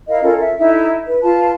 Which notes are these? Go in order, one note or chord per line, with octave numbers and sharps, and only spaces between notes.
E4 A#4 D#5 F5
C#4 F4 A4 A#4
E5
D#4 E4 A4 E5
B4
F4 B4 A5